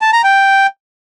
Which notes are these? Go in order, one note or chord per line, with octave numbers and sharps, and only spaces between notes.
A5
A#5
G5